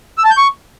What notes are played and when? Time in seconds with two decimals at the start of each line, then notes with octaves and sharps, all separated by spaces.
0.18 E6
0.24 A5
0.31 G6
0.37 C#6